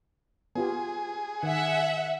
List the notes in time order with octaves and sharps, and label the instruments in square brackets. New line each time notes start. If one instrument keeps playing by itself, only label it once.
[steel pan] B3 F4 G4 [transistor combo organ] G#4
[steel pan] D#3 [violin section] E5 F#5